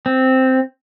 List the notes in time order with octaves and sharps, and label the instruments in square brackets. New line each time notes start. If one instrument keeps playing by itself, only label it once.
[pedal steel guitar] C4